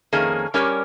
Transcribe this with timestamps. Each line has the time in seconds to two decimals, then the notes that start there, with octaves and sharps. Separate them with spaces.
0.12 F2 D#3 A#3 C#4 G#4
0.54 G3 C#4 G4 A#4 C#5